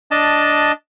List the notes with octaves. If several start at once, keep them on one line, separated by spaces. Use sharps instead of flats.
D4 D#5 A5